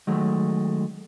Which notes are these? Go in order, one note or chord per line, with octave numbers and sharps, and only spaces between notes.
D#3 F#3 G#3 A3